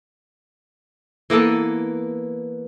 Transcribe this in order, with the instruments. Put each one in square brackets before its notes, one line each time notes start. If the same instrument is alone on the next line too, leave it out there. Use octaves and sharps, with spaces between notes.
[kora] E3 A#3 B3 A4